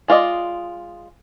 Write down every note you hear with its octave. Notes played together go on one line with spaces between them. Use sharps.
G#3 F4 D5 D#5